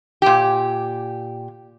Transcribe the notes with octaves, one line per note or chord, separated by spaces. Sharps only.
A#2 G4